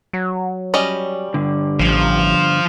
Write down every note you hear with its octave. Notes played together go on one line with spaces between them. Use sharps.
F#3
G3 C#4 D#5
G2 D3
A1 F3